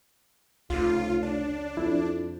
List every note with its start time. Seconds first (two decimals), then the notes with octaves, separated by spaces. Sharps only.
0.70 F1 C#2 F4
1.23 D4
1.77 F2 E4